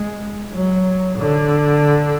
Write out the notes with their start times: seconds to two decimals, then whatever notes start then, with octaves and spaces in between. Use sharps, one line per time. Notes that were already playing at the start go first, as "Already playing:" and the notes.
Already playing: G#3
0.53 F#3
1.18 D3